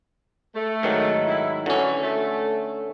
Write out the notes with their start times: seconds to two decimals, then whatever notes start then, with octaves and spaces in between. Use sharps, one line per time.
0.55 A3
0.83 G#2 D#3 F#3
1.27 E4
1.66 D3 E3 F#3 C#4
2.03 A3